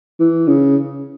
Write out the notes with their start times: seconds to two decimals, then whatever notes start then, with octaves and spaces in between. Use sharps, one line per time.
0.20 E3
0.48 C#3